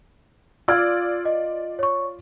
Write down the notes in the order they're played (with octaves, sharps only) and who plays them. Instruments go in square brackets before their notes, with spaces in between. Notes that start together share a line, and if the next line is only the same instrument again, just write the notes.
[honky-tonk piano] F4 D5 [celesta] E6 F6 G#6
[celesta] D#5
C#5 C#6